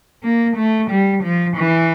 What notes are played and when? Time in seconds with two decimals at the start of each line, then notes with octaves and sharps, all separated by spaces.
0.23 A#3
0.57 A3
0.90 G3
1.23 F3
1.57 E3